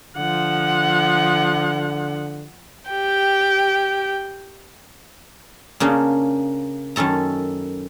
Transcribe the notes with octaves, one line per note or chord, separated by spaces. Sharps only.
D3 F3 F#5
G4 G5
C#3 A#3 C#4 D4
F#2 D#3 C#4 A4 A#5